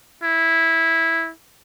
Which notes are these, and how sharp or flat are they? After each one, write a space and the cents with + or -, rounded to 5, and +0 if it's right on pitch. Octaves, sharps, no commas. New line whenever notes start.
E4 -10